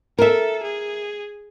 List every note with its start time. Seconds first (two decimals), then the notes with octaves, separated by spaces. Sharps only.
0.19 A4 A#4 E5
0.63 G#4